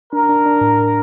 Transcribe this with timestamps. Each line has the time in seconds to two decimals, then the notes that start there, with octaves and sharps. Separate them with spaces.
0.13 D4 A#4
0.29 D4
0.46 D4
0.61 A2